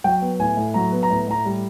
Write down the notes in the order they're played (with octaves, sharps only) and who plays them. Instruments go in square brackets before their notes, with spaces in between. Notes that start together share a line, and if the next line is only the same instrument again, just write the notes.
[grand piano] F#3 G5
B3
A2 G#5
A2
F#3 A#5
B3
A#5
A2
A2 A#5
G3